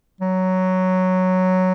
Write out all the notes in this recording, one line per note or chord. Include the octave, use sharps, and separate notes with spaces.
F#3